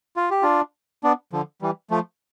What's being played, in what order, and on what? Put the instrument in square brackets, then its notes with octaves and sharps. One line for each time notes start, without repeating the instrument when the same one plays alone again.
[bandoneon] F4
G4
D4 F4
B3 D4
D3 F3
E3 G3
F3 A3